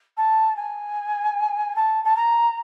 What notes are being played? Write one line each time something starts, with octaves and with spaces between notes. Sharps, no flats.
A5
G#5
A5
A5
A#5